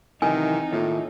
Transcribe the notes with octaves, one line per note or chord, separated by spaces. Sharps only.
C3 D#3 E3 F#3 D#4 G#5
A2 D#3 A#3 F4